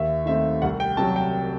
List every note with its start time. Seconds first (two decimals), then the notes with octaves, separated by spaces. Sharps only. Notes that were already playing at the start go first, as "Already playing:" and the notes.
Already playing: D#2 E5
0.26 D#3 A3 C4 E5
0.62 C2 F#5
0.80 G5
0.97 C3 F#3 A5
1.16 G5